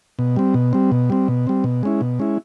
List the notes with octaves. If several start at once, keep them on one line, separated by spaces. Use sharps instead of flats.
B2
G3 C4
B2
G3 C4
B2
G3 C4
B2
G3 C4
B2
G#3 C#4 E4
B2
G#3 C#4 E4